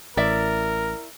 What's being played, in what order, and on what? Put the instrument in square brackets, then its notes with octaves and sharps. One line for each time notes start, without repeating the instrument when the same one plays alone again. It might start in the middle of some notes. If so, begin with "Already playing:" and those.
[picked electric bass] A1 [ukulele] E4 D5 E5 [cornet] A#4